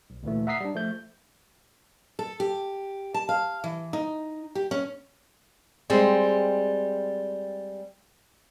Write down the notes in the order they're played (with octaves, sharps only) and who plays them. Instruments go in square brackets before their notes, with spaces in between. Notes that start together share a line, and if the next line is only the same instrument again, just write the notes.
[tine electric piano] B1
D2 A#2 E3 A3
E5 F#5 A#5 D#6 B6 C7
G3 D4
F3 A3 G6
[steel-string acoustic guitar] A4
G4
A5
F5
E3
D#4
G4
C#4
[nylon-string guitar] G3 G#3 C4